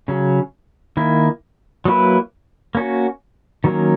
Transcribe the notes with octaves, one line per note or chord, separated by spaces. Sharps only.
C#3 F#3 C#4
D#3 A#3 E4
F#3 A#3 E4 B4
A#3 C#4 F#4
D#3 F#3 A#3 C#4